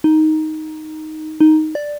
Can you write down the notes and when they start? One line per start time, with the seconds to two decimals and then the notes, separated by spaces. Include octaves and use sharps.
0.04 D#4
1.40 D#4
1.75 D5